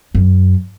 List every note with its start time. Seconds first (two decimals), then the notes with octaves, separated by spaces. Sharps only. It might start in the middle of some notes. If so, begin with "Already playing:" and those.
0.15 F#2